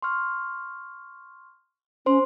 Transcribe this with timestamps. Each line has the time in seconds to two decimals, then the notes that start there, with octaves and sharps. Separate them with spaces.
0.02 C6 C#6 F6
2.06 C#4 C5 C6